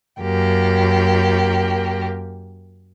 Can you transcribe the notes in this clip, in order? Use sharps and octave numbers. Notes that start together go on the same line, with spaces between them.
F#2 A#3 G4